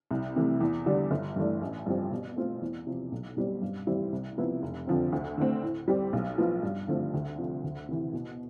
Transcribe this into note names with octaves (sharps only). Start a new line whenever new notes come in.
C2
C3 E3 A3
E2
D3 G3 D4
G1
G2 E3 A3 D4
A1
G2 F3 C4 G4
B2
A3 C4 F4
E2
C3 F3
B1
B2 G3 C4
G2
E3 G3 C4 E4
C2
C3 F3 B3 E4
F1
F2 D3 F3 C4
D2
D3 A3 C4
A2
G3 C4 G4
B1
A2 F3 B3 F4
G2
D3 F3 A3 C4
D2
C3 F3
D2
C3 E3
B2